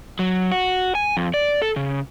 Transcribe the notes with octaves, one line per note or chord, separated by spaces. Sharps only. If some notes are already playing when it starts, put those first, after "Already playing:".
F#3
F#4
G#5
F2
D5
A4
C#3